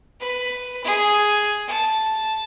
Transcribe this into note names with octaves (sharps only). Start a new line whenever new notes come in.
B4
G#4
A5